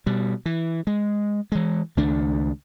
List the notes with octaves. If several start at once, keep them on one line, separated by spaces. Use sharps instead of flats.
B2 G3
E3
G#3
E3 G#3
C#2 D#3 A3 D4